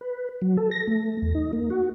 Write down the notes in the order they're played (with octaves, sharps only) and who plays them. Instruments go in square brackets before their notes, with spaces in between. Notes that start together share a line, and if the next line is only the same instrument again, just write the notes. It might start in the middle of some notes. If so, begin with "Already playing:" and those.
[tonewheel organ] B4
F#3
A4
A#6
A3
E2
D#4
A#3
F#4